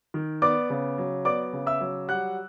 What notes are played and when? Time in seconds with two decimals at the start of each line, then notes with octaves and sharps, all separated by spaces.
0.14 D#3
0.42 B3 D5 D6
0.70 C#3
0.98 F#3
1.25 B3 D5 D6
1.53 C#3
1.67 E5 E6
1.80 F#3
2.08 G3 F#5 F#6